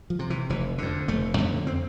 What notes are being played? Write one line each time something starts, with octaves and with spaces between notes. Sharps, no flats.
F3
C3
E3
F1 E3
F2 D3
F1 A3
F2 D3 B3
C4